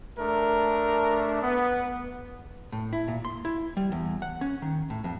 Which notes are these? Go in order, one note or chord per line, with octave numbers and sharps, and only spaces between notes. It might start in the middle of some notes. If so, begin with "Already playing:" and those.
A3 D4 A#4
B3
A2
E4
A#2
C6
E4
G3
E2
F#5
C#4
D#3
A2
F2